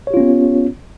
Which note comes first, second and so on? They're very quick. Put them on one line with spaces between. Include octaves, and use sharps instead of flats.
C#5 G4 F4 C#4 B3